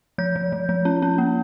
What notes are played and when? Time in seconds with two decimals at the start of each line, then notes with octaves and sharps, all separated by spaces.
0.18 F3 G6
0.36 F3
0.52 F3
0.69 F3
0.85 C#4
1.02 C#4
1.18 A#3